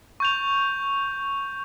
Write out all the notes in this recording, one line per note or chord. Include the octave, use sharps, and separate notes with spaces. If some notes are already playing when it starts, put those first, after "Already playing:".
C#6 G6 F7